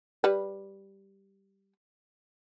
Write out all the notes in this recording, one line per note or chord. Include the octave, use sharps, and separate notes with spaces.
G3 B4